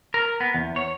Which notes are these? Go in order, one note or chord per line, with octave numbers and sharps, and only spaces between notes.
A#4
B3
E2
C#5